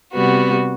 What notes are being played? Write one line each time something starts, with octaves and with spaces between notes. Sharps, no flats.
C3 G3 B3 F#4